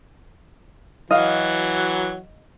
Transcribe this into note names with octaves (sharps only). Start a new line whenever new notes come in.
E3 F#3 F#4 D#5 F5